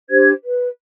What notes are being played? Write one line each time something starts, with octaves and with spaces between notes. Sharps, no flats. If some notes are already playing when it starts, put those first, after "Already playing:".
D4 G4 C5 G#6
B4